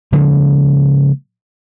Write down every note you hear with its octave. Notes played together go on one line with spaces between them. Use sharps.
C#3 F3 G#3 A#3